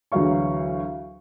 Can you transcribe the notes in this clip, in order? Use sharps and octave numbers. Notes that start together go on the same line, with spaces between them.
D2 E3 F#3 G#4 F5 C#6